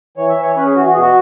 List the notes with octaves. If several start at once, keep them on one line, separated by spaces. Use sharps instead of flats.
E3 C#5
E5
E3 C#5
C#4 B4
G#4
E3 F#4
F#4
B2 G#4
F#4